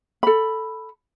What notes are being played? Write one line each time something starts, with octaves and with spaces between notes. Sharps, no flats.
A4 B5